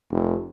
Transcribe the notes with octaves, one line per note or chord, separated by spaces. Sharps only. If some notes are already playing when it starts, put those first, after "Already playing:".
F1